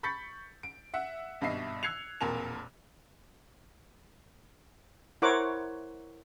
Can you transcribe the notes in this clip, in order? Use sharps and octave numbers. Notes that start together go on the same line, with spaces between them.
B5 C#6 G6 A6 B6 C#7
D7
E5 F#5
G#1 G2 B2 D#5 E5 C7
E6 F#6 G#6 C7 C#7 F7
E1 F2 A#2 A#4 A5 F7
E4 A#4 C5 C#5 F#5 D6